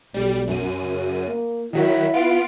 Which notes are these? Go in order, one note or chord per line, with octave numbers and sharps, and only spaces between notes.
B1 G3
F#2 D#7
C#3
A#3
D#3 F#3 E4 B6
B3 F4 D7